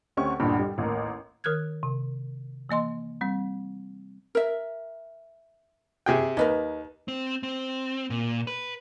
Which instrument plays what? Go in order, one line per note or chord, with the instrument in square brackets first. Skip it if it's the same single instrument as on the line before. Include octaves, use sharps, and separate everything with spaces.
[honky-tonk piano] D2 C4 C#4 G4 C#6
A1 D2 G2 A#2 G5 B5
G3
A1 D#2 A#4
[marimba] D#3 A#4 F6 F#6 G#6
C3
E3 A#3 D#5 C6
G3 C4
[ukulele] A#4 E5
[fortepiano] C3 G#4 G5
[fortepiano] D#2 [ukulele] A#4 B4 D#5
[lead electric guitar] C4
C4
A#2
B4